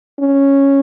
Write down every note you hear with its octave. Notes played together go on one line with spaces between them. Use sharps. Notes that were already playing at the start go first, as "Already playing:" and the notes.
C#4